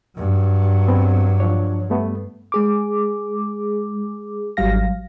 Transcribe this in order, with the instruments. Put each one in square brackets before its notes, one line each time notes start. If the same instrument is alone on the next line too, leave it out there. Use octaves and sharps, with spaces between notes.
[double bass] G2 F#3
[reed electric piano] B3 C4
F3 D4 C#5
G3 A3 B3
[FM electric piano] G#3 G#4 D6
G#1 F#3 G3 F5 A#6